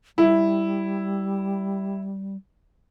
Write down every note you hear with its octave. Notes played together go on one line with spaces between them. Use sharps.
G3 E4